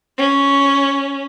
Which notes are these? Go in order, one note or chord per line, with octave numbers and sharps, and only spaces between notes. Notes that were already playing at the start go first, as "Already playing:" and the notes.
C#4